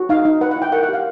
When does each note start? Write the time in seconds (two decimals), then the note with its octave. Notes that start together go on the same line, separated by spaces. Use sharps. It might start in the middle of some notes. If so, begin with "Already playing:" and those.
Already playing: F#4
0.09 D#4 F5
0.25 D#4
0.41 B4 F#5
0.51 F#5
0.56 E4
0.62 G5
0.72 A#4 F#5
0.83 F#5
0.89 G4 F5